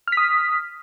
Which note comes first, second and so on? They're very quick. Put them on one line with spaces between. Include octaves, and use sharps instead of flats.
F6 B6 D#6